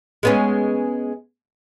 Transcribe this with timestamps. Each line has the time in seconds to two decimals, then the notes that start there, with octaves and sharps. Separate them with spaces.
0.23 G#3 B3 C#4